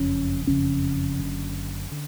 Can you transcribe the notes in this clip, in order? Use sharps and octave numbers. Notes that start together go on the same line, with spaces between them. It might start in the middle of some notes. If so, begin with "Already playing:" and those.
Already playing: F#1 F2 C#3 C#4
F#1 F2 C#3 C#4
F#1 F#2 D3
D3